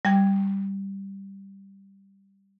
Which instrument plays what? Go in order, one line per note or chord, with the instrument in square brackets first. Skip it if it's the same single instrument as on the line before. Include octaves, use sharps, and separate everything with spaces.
[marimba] G3 G5 G#6